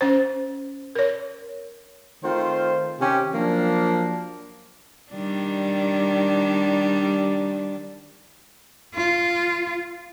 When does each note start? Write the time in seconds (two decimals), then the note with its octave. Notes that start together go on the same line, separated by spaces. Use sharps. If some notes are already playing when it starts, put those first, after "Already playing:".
0.01 C#4 C5
0.95 A#4 C#5
2.24 D#3 A3 C4 F4 C5
3.00 C3 D#3 C#4 G4
3.34 F3 F#3 A#3 D4
5.12 D#3 G3 D4
8.95 F4